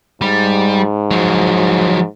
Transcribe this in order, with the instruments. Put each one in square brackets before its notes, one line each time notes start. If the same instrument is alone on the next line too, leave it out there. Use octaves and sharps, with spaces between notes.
[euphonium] G#2 [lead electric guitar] G3
[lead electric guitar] F3 F#3